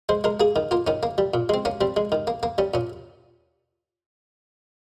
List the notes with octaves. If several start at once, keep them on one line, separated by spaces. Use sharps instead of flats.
G#3 C5
G#3 A#4
A#3 G#4
D#3
A#3 F4
D#3 C#4
A#3
G3
A#2
G#3 C4
A#3 C#4
G3 C4
G#3
D#3
A#3
A#3
G3 C#4
A#2 C#4